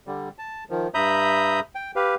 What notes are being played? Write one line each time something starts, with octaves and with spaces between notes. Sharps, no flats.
D3 G3
A5
D#3 F3
G2 E5 A#5 B5 D#6 G6
G5
G4 B4 F5